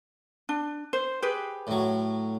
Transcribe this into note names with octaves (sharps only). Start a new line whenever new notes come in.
D4
C5
G4 G#4 B4
A2 F#3